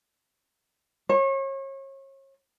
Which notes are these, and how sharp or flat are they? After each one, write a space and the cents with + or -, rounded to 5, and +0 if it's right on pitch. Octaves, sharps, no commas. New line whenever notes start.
C#5 -35